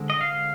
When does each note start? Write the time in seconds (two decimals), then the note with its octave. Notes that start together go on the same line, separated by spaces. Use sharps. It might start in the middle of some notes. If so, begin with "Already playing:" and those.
Already playing: D3 G#3 C4
0.10 D#5
0.21 F5